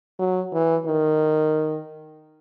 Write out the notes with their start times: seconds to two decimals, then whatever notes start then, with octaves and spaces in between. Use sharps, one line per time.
0.19 F#3
0.53 E3
0.86 D#3